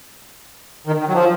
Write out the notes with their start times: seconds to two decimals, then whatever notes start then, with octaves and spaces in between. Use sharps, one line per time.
0.87 D#3
1.00 D#3
1.08 F#3
1.13 F3